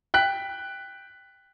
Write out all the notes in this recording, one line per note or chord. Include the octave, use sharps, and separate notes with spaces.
G5 F#6 B6